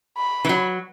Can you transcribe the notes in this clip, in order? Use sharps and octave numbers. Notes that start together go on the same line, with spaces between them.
B5
E3
F#3